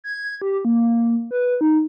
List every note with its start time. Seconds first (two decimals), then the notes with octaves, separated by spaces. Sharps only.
0.04 G#6
0.42 G4
0.65 A#3
1.31 B4
1.61 D#4